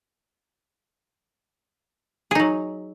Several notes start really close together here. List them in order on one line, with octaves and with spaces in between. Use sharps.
G#4 D#4 F#3